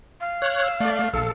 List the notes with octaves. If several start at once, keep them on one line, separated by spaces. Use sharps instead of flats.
F5
C#5 F#6
E6
A3 D5
A#1 A4 F5